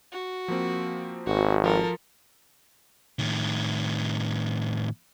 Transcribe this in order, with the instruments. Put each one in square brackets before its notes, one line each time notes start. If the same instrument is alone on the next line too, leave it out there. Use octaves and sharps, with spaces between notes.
[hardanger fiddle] F#4
[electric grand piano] F3 A#3 C4
[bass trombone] G#1 [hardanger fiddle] F#4
[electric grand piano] F3 F4 [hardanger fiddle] A4 A#4
[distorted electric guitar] A2 D#3